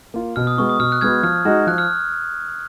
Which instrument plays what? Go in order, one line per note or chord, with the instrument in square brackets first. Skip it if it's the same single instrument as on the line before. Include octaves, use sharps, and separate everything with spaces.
[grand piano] A#3 F4
[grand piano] B2 [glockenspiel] F6
[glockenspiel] D#6
[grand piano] G#3 B3 F#4 [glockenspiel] C#6
[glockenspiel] D#6
[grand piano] B2 [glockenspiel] F6
[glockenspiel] F#6
[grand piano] G#3 B3 F#4 [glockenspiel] F6 G#6
[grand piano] F3 [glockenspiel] F6
[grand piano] G#3 D#4 F#4
[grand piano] F3 [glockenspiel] F#6
[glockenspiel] F6